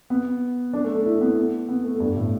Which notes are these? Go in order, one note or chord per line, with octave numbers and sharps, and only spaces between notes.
B3
D4
A3
D4
E4
B3
B3
A3
G2
A2